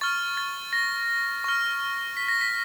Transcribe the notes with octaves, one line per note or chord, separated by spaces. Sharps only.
C#6 F6 A6
A6
A#6
C#6 F6
B6
A#6
B6